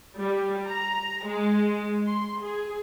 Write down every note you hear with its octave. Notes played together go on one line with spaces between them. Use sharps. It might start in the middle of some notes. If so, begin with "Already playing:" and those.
G3
A#5
G#3
C6
G#4